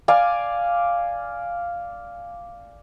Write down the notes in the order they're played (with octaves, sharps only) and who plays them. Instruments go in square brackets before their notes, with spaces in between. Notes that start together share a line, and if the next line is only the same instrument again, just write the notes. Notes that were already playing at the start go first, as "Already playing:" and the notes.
[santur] D5 F5 G#5